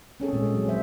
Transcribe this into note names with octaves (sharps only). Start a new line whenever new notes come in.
C4 C#4 G#4 A4
A#2 G#3
F#3
F#3 C5 E5